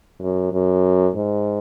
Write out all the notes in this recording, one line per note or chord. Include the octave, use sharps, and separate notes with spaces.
F#2
F#2
G#2